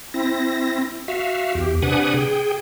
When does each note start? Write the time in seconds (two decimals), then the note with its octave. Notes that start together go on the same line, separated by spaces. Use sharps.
0.14 C4 E4 A#6
1.08 F#4 E5 F5
1.55 E2 G4
1.82 C3 D4 B4 F#5 G#5 D#6
2.14 G#4 G5